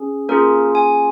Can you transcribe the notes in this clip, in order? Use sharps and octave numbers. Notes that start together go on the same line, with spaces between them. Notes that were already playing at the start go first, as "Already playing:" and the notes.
Already playing: C#4 G#4
A#3 C#4 F4 G#4 A#4
G#5